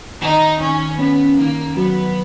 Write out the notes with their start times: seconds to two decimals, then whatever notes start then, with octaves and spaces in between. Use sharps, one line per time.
0.21 D#3 D#4
0.61 D#3 C#4
0.99 B3 C#4
1.37 D#3 A#3
1.77 F#3 B3